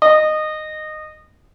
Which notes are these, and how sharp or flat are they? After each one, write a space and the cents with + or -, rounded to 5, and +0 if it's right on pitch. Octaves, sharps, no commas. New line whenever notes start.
D#5 -15